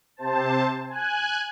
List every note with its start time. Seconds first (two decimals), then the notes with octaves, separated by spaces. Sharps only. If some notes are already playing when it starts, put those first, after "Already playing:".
0.17 C3 C5 A5
0.88 G#5 F#6